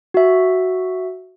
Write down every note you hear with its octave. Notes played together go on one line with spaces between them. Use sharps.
F#4 E5